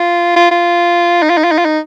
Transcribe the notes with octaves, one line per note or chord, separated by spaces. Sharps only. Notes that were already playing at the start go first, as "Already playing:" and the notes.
Already playing: F4
F4
F4
D#4
F4
D#4
F4
D#4
F4
D#4